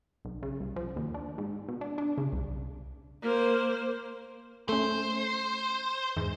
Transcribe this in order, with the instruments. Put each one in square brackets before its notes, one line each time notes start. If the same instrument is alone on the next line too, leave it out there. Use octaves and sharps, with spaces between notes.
[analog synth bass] B1
C#3
C2
F3
D#2
D4
G#2
B2
D4
D4
C#3
C2
[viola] A#3 C5
[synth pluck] A3 C#4 [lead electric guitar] C5
[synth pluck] E2 G#2